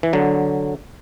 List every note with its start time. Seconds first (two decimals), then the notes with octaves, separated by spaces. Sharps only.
0.03 E3
0.13 D3 F#3